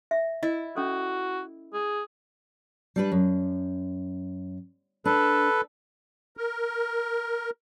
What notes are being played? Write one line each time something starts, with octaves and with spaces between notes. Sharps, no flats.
E5
E4 D#5
C#4 F#4 A4
G#4
G3 D4 B4
F#2
D4 A4 B4
A#4